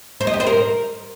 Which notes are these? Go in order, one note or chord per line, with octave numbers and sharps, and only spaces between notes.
C5
D#5
G4
C5
A#4